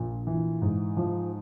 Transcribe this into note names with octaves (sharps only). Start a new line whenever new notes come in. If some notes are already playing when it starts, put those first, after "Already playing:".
Already playing: A#1 A#2
E3
G#2
F3